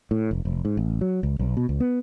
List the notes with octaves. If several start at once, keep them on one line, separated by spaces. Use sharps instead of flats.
A2
F1
F1
G#2
A1
F#3
C#2
B1
B2
C#2
B3